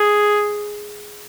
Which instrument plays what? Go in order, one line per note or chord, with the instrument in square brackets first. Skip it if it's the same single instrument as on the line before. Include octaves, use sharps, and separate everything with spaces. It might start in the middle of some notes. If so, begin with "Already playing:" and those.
Already playing: [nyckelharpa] G#4